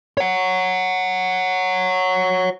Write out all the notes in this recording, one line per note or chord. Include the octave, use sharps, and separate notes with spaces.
C#5 F#5